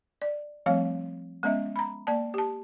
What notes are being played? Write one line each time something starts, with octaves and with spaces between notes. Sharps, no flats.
D5
F3 G3 A3 C4 C#5 F5
G#3 B3 C#4 D#5 E5
A#5 B5
A#3 D5 A5
G4 A5